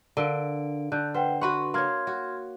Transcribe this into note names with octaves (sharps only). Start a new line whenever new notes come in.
D3 A#4 F5 D7
D3 F#6 G6
B4 C5 F#5 G5
F#4 B4 F#5 C6 C#6
A#3 C#5 C6 F6 G#6
F#4